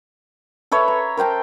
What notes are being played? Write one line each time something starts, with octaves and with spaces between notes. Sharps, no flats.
A4 B4 C#5 E5
A#5
A#4 C5 G5 A5